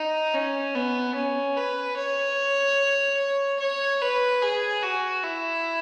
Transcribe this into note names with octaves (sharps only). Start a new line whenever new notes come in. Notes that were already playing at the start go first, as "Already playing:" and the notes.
Already playing: D#4
C#4
B3
C#4
B4
C#5
C#5
B4
G#4
F#4
E4